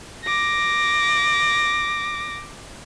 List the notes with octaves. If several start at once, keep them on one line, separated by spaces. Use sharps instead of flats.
D6 A#6